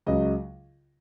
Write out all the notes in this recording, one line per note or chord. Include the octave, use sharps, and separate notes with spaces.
C#2 C#3 F#3 D#5